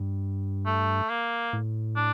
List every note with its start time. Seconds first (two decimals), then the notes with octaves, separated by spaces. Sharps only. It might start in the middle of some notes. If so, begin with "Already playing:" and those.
Already playing: G2
0.66 A3
1.10 A#3
1.53 A2
1.96 D4